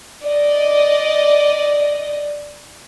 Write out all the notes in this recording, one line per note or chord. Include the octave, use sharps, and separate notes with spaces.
D5 D#5